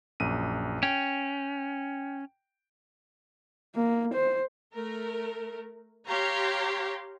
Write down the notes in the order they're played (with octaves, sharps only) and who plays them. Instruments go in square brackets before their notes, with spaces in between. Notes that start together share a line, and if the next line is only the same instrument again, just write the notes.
[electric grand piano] A#1 F#2 D#7
[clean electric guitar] C#4 [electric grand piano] G5 D7
[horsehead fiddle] A#3
C5
[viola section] A3 A#4
G4 C#5 F5 A#5 C6